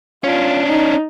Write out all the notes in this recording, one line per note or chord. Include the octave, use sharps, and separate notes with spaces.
C#4 D4 F4
D#4